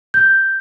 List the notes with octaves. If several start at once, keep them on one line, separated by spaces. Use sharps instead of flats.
G6